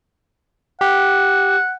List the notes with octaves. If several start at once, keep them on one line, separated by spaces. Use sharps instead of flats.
G4 F#5